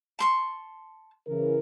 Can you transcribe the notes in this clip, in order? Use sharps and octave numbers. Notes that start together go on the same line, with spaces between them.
A5 C6 C#6
C#3 E3 A#4